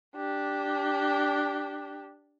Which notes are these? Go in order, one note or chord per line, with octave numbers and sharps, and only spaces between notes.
D4 G4